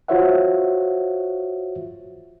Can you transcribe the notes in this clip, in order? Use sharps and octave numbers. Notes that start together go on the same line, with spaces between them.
F4 F#4 C5 C#5 E5 F#5